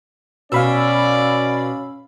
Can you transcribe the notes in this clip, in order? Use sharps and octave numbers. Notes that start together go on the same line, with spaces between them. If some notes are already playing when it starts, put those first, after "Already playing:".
B2 C#4 D5 F5 B5 E6